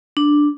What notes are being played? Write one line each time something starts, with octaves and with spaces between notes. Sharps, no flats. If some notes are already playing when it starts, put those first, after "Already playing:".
D4